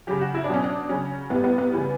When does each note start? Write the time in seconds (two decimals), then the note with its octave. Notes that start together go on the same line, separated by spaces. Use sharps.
0.07 C#3 F#3 G4
0.21 F#4
0.34 E4
0.44 D4
0.49 B2 F#3 C#4
0.64 D4
0.89 C#3 F#3 C#4
1.30 A2 G3 B3
1.44 B3
1.58 B3
1.71 C#3 E3 G3